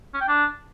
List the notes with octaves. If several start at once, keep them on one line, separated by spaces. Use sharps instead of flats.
C#4
G5
D4